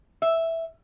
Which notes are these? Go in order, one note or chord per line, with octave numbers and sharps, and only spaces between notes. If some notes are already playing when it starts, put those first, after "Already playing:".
E5